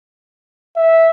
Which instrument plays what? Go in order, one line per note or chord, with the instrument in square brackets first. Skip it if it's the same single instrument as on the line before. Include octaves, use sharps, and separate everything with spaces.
[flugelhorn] E5